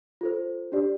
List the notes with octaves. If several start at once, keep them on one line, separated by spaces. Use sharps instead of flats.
F4 A4 C5
D4 G4 D5